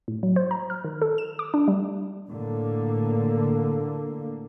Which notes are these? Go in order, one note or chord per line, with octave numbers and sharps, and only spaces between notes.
A2
F#3
C5
A#5
F6
D#3
A4
E7
D6
D4
G3
A2 D3 A#3